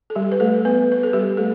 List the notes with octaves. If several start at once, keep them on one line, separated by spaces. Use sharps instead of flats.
A4
G3 G4
B4
A3 A4
B3 B4
B4
A4
G3 G4
A3 A4